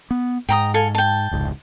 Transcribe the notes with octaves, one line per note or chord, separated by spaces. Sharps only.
B3
G#2 G5 A#5 D#6
A4 F5 G#5
G5 A5
F1 C#2 G#2